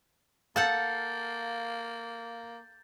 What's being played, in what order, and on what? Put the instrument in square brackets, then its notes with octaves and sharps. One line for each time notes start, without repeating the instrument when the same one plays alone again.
[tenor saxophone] A#3 [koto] A4 F#5 A5 [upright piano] F5 [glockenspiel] G6 A6